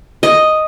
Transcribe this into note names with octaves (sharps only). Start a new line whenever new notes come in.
D#5